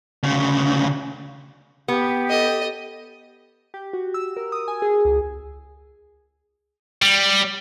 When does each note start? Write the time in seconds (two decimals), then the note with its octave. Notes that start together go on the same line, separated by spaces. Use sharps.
0.23 D2 C#3
1.88 B3 G4
2.28 A4 D#5
3.74 G4
3.93 F#4
4.14 E6
4.37 A#4
4.52 D#6
4.68 G#5
4.82 G#4
5.05 C#2
7.02 G3